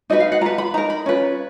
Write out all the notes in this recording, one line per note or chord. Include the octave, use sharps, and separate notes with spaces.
D#4 F#4 B4 D#5
F5
F#5
F4 B4 A#5
B5
D#4 A#4 A#5
B5
C#4 F4 B4